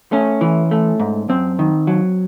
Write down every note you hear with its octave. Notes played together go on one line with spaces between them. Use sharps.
A3 C#4
E3
A3
G#2
F#2 C4
D#3
F#3